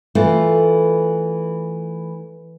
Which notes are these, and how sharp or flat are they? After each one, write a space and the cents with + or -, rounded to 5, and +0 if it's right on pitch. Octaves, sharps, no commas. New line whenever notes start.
E3 +0 A3 +0 F4 +0